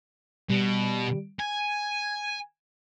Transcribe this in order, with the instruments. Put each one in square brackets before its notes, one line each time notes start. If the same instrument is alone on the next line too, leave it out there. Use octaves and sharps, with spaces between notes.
[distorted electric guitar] B2 [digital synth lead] G3
[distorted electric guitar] G#5 [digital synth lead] G#6